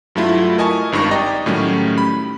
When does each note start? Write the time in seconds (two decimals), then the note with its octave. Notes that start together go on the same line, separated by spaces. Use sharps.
0.15 G2 F#3 A3 E4 F4
0.58 A#4 D#5 G#5 A5 C#6
0.92 G#1 G2 D#4 C#6
1.11 D5 D#5 G5 A#5
1.46 A2 D#3 F#3 G3 A3 C#4
1.98 B5